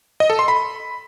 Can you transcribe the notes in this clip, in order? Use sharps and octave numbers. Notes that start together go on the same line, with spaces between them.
D#5
A4
C6
B5